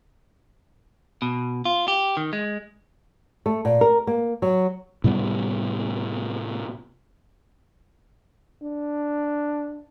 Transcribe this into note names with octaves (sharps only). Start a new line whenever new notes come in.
B2
F4
G4
D#3
G#3
A3
A#2
A#4
A#3
F#3
A2 C3 G3 B3
D4